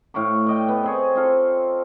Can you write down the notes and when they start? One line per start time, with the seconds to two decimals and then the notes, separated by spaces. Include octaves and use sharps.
0.14 A2 F5 C#6 D6
0.47 D5 D#5 G5
0.68 B3
0.83 C4 G#4 C#5
1.15 C4 F4 A4